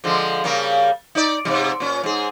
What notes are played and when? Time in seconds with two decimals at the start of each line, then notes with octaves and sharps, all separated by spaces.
0.04 D3 F3 G#3
0.44 C#3 G3 A#3
1.15 D#4 D5
1.45 G#2 C3 G3
1.80 A#2 C#4
2.03 G#2 G#4